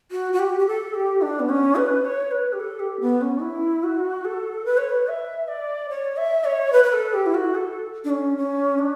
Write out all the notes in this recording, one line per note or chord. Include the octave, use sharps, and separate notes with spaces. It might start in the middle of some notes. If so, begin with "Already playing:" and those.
F#4
F#4
G4
G4
A4
G4
D4
B3
C#4
B4
C#5
B4
G4
A4
G4
B3
C#4
E4
F#4
A4
B4
C#5
B4
E5
D5
C#5
E5
C#5
B4
B4
A4
G4
E4
F#4
A4
D4
C#4
C#4
D4